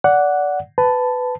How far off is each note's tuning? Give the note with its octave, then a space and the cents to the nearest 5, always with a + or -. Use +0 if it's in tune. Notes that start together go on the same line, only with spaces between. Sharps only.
D5 -20 F#5 +0
B4 +20 A5 +0